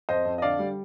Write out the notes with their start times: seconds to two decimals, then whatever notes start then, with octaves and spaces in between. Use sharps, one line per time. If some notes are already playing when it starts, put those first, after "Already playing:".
0.09 F2 C5 D#5
0.25 F2
0.38 D#5
0.42 D3 D5 F5
0.59 G3